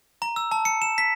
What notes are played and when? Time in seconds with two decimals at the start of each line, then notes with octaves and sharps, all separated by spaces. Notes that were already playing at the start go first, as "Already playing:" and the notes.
0.22 A#5
0.36 E6
0.51 A5
0.65 C#7
0.82 E7
0.98 B6